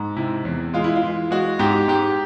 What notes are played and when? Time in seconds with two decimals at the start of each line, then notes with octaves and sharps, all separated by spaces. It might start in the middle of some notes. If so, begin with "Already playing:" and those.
Already playing: G#2
0.16 C3 E4
0.45 E2
0.74 G#3 F4
0.84 E4
0.96 F4
1.03 E3
1.31 G#3 F#4
1.59 G#2 G4
1.88 G#2 G4